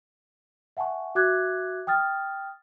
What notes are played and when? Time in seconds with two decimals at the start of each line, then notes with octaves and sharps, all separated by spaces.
0.77 E5 F#5 G#5 A5 C#6
1.15 F#4 E5 D6 F#6 G#6
1.87 G5 D#6 F6 A6